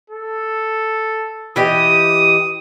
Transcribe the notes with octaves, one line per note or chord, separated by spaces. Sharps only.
A4
E3 G4 D#5 D#6